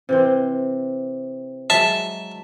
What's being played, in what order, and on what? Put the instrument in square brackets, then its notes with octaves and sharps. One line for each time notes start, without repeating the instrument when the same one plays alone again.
[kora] C3 E3 C4
[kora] F#3 G#3 [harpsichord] E5 A5